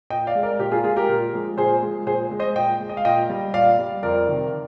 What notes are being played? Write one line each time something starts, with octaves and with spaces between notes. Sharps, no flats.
A#2 D#5 G5
D5 F5
G#3
A#4 D5
A#2 G4 A#4
F4 G#4
G#3 F4 G#4
G4 A#4
A#2
F3 G#3
A#2 G#4 C5
F3 G#3
A#2 G#4 C5
G#3
C5 D#5
A#2 D#5 G5
G#3
D#5
F5
A#2 D#5 G5
G3
A#2 D5 F5
G3
F2 A#4 D5
C3 D#3